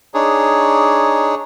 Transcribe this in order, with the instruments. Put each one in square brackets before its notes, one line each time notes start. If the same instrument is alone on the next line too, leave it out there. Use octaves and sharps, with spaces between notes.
[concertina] D4 D#4 G#4 C#5